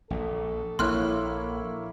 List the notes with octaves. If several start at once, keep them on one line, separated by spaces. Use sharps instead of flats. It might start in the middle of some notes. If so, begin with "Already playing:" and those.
A#1 A#2 A4
A#1 A#3 E4 C#5 C6 F6 F#6